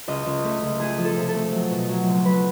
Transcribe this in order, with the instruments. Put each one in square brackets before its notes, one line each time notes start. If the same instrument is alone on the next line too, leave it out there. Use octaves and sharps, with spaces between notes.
[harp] C#2 D#5
C#2
A3
C#2
A3 G#4
F3
A4
C3
A4
A3
F#3
B2
F#3
C#2
F#3 B4